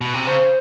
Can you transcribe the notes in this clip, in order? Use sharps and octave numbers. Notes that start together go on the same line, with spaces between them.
B2
C3
C#3 C5